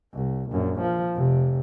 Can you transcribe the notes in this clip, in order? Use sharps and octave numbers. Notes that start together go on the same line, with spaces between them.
C2
A#1 F#2
F3
F1 C3